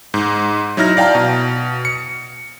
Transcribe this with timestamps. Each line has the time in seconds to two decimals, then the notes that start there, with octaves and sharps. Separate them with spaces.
0.14 G#2
0.77 F#3 D#4 E4 F6 A#6
0.97 D5 F5 G5 A5 A#5
1.15 B2
1.85 C#7